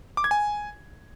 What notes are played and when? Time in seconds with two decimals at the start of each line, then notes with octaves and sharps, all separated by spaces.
0.17 D6
0.24 G#6
0.31 G#5